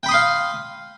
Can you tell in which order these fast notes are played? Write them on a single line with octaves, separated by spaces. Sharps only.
G5 B5 D#6 C6 F5